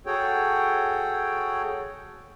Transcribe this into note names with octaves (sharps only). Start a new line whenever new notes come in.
F#4 G#4 A4 C#5 G5